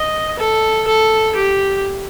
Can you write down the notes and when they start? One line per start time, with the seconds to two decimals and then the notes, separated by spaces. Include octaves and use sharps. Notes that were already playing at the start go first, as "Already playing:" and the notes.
Already playing: D#5
0.39 A4
0.87 A4
1.36 G4